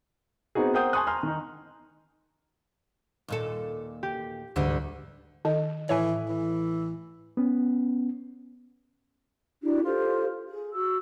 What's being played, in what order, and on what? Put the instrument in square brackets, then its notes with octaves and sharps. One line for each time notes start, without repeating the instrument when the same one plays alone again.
[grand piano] B3 C4 D#4 F#4 G#4
A#4 C5 F#5 G5 D#6 G6
G#5 A5 C6 C#6 D#6 F#6
G#5 A#5 C6 F6
D#3 D#4
[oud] D#2 A#2 A4
[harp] G4
[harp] D2 [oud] G#2 D3 G3
[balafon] D#3 D#5
[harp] A1 A2 [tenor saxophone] E3 [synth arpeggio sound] C#5 E5 G#5
[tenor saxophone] E3
[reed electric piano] B3 C#4
[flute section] D4 E4 F#4 G4
F4 G4 A4 C5
G#4
F#4 E6